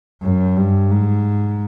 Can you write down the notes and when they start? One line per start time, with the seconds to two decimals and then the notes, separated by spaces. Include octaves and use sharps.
0.23 F#2
0.57 G2
0.91 G#2